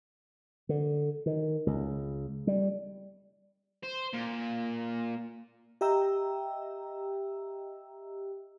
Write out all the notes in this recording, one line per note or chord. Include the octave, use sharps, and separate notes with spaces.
D3
D#3
C#2
G3
C5
A#2
G4 D#5 E5 G5 A#5 E6